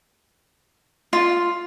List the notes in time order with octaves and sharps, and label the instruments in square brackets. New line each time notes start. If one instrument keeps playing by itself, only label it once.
[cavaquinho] F4